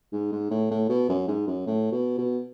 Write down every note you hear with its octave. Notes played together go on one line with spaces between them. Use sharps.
G#2
G#2
A2
A2
B2
F#2
G#2
F#2
A2
B2
B2